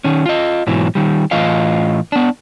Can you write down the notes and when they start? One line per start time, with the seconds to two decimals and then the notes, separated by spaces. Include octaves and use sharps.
0.04 D#3 C#4
0.26 F4 D#5
0.67 G#2 B2 E3 F#3
0.95 D#3 G3
1.31 A2 E3 F4 D#5 F5
2.12 B3 D4